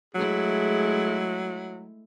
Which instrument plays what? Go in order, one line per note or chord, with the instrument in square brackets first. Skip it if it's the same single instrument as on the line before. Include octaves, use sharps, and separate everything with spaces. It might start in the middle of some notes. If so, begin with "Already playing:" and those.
[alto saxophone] F#3 [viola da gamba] G#3 A3 E4 [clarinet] G#4